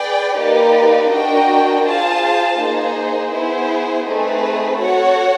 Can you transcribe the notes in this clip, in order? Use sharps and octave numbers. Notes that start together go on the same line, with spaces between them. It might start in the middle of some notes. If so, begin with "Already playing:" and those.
Already playing: G#4 B4 D5 G5
A#3 D#4 G4 B4 D5
D4 F#4 A#4 D#5 G5
F4 G#4 C5 F5 A5
A#3 D#4 G#4 C5
B3 E4 G#4 C5
A3 C4 D#4 G#4 B4
F#4 A4 C#5 F#5